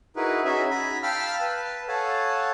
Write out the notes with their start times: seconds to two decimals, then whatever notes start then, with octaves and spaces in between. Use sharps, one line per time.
0.16 D#4 E4 F#4 G#4 A#4 B4
0.45 C#4 D#4 F#4 G#4 E5 G#5
0.71 G#5 A#5 B5
1.03 F5 G5 A5 B5 E6 F6
1.41 B4 A5
1.88 A4 C#5 F5 F#5 G#5 A5